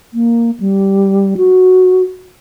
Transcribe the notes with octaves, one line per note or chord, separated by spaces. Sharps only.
A#3
G3
F#4